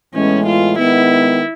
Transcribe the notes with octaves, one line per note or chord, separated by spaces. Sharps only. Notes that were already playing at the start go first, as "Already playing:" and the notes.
A2 E3 G#3 B3 C#4
F4
D#3 G#3 B3 E4